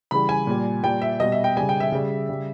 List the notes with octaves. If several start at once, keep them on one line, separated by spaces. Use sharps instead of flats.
C#3 E3 G3 B5
G#5
A#2 G3
A#2 G3 G5
E5
B2 G3 D#5
E5
G5
C#3 G3 G#5
G5
E5
C#3 G3
C#3 G3